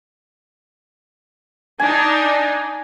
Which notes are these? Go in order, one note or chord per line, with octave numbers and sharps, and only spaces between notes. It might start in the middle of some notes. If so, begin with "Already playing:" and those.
D4 D#4 G#5